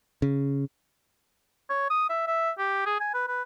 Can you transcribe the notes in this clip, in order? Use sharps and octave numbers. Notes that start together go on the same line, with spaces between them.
C#3
C#5
D#6
E5
E5
G4
G#4
G#5
B4
B4